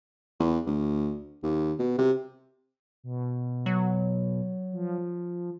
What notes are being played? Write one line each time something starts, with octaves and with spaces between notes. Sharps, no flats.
E2
D2
D#2
B2
C3
B2
F#3
F3